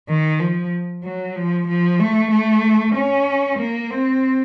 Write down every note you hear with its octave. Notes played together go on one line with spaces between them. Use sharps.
D#3
F3
F#3
F3
F3
A3
A3
C#4
A#3
C4